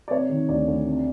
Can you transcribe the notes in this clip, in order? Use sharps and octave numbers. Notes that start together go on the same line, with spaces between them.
D5
C3 C#5
D#3
D2 D5
D2
C3